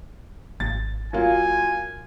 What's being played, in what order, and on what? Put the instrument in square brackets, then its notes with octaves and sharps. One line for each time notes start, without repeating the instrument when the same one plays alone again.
[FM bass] G#1 [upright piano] A6
[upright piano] F#3 A#3 F4 [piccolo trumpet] G#5